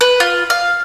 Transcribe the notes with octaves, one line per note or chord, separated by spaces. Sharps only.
B4
F4
F5